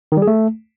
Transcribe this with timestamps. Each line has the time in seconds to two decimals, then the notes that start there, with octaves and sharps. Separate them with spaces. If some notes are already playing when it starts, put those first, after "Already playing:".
0.12 D#3
0.17 G3
0.22 G#4
0.27 A3